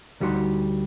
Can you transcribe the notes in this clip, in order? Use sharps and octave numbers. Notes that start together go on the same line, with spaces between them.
D2 G3 D#4 F#4 C6